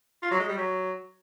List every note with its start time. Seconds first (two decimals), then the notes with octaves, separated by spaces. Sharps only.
0.23 F4
0.31 F#3
0.40 G#3
0.49 G3
0.57 F#3